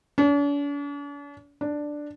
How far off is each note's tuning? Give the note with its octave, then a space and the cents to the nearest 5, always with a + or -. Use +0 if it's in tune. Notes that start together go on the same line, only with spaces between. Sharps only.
D4 -45
D4 +5